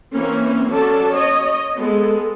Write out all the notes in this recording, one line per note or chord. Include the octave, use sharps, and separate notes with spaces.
E3 A#3 C4 C#4
F#3 C#4 A4 D5 A5
C#5 D#5
G#3 B3 A4